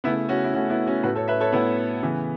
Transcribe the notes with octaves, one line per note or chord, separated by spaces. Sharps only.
C#3 A3 B3 E4
C#4 F#4
E4
C#3 A3 C#4 F#4
B3 E4
C#4 F#4
A2 A3 F#4 B4
A4 C#5
B4 E5
A4 C#5
A2 A3 B3 E4
C#3 E3 B3